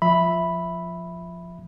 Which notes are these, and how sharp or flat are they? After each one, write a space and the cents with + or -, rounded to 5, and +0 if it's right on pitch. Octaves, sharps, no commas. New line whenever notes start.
F3 +0 E5 +0 B5 +0